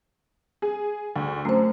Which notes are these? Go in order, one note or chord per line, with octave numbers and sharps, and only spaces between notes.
G#4
D2
F#2 A3 C5